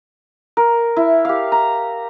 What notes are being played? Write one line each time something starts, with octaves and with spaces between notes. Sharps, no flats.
A#4
E4
G4 F5
A#5